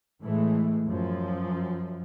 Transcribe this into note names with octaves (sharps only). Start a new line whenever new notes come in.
A2 E3 G#3 A3
F#2 F3